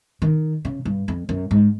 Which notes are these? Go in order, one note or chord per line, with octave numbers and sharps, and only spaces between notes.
D#3
C#3
G2
F2
F#2
G#2